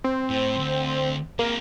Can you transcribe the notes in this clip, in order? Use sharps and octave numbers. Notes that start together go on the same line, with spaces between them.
C4
A2
D2
G#3 A#3 C4